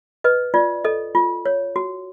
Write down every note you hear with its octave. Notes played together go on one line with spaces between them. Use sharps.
B4 D#5
F4 D5
A4 D#5
F4
C#5
F#4